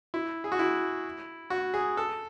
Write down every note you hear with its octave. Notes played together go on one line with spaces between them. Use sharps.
E4
G#4
F#4
E4
F#4
G#4
A4